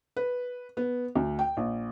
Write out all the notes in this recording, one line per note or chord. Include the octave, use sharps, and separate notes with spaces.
B4
B3
D2
G5
A#1